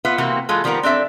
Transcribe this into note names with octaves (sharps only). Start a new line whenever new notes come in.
B3 F4 B4 E5
C3 E3 A#3 C4 F#4
E3 G#3 F4 A4
D#3 F3 G3 B3 A#4
C4 D4 A4 E5